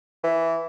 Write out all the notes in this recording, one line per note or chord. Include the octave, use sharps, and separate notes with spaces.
E3